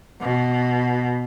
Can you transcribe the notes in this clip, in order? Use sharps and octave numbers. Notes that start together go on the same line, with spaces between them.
B2